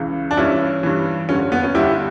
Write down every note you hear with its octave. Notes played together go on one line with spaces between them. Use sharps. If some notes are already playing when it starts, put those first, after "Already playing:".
Already playing: C#2 C#3 E3
D4
G2 E3 C#4 E4
G2 E3
G2 D3 C#4
B3
C#4
G2 D3 E4 G4